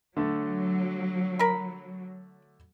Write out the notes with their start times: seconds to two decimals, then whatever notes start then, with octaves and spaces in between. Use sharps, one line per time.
0.17 D3 F#3 A3
1.39 A#4 B5